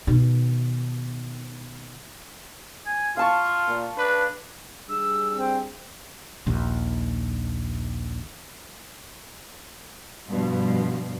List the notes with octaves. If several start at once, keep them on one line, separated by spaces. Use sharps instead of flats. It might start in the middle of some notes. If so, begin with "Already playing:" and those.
B2 D#3
G#5
F4 F5 A5 C#6
A#2
D4 B4
G3 D4 G#4 E6
C4
A#1 D#2
G2 B2 F3